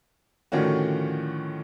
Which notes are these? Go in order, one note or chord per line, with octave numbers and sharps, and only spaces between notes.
A2 D3 D#3 F3 C#4 F#4